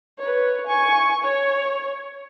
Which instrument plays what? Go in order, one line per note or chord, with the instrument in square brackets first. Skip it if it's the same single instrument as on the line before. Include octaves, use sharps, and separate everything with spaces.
[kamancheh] B4 C#5
G#5 C#6
C#5